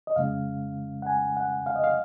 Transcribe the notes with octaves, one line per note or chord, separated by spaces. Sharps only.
D#5
F2 C#3 G#3 C#4 F5
F#5
G#5
F#5
F5
D#5
F5